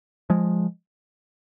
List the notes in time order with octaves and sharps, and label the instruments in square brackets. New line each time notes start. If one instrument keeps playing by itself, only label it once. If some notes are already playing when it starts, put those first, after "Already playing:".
[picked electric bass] F3 G#3